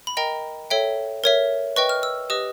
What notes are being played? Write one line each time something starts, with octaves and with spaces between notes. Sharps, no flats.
B5
A#4 D#5 G5 A#5
A4 C#5 E5 G5
A#4 C#5 E5
B4 D#5 G5 C#6
F6
E6
G4 B4 D#5 D#6